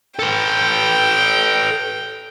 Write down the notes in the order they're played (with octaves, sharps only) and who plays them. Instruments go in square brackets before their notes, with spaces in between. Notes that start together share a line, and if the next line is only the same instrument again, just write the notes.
[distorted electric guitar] A4 B4 [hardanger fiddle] G5